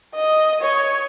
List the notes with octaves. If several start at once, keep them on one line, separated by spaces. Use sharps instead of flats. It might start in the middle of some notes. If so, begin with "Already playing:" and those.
D#5
C#5